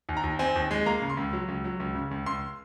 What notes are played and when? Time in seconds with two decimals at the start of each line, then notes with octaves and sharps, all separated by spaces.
0.09 D#2
0.17 A#5
0.24 D#2
0.39 C4 G#5
0.56 D#2
0.71 G#3
0.86 A#3 A#5
1.02 C#3
1.10 C6
1.17 C#2
1.33 F#3
1.48 C#2
1.64 F#3
1.80 C#2
1.95 C#3
2.11 C#2
2.26 C#2 C6